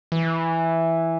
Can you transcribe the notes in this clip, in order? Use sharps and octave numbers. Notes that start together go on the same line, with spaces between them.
E3